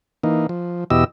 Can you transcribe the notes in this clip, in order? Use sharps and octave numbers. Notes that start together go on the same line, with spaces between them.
E3 A#3 D#4
F3
E2 B2 E4 G4 D#5 E6